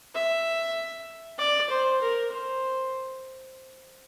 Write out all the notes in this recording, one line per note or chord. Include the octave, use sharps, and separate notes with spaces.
E5
D5
C5
A#4
C5